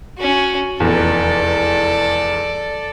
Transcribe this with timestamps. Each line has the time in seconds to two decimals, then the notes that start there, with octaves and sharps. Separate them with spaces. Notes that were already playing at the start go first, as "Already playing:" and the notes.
0.18 C#4 F#4
0.80 F1 E2 A4 D5